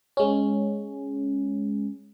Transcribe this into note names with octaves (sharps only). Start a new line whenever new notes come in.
G#3 C#4